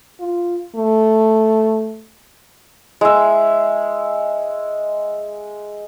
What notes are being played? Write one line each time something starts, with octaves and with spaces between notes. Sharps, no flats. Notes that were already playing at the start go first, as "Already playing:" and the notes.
F4
A3
G#3 E5